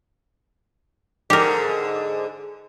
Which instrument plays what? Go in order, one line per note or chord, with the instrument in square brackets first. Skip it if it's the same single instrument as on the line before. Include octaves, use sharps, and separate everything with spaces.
[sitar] G#2 D3 [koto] G4 A#4